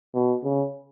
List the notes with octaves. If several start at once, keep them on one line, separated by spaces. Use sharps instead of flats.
B2
C#3